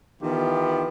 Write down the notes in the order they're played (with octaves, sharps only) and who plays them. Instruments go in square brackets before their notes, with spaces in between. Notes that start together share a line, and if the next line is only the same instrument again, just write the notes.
[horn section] D#3 E3 B3 F4 G4